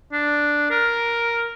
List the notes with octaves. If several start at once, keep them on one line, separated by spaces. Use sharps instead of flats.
D4
A#4